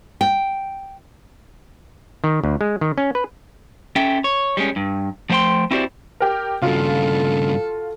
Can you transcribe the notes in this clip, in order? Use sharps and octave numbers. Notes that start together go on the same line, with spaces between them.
G5
D#3
D2
G#3
D#3
C#4
B4
C#4 A4 E5 G5
C#5
G3 G#3 C#4
G2
F3 A3 C5 F#5 G5 C6
C4 E4 F#4 G4 C5 D5
G4 A#4
G2 C#3 F4 F#4 A4